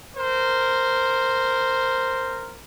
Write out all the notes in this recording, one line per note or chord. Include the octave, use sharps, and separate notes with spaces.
A#4 C5